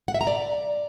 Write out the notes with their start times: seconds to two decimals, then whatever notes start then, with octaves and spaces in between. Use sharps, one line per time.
0.08 F#5
0.14 E5
0.21 A#5
0.27 D5